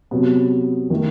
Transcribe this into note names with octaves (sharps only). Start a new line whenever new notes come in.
C3 F#3 B3
D#3 A3 E4